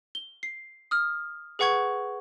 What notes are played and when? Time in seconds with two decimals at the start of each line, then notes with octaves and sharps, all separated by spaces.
0.15 G7
0.43 C7
0.91 D#6 F6
1.59 G#4 B4 F#5 C#6 G#6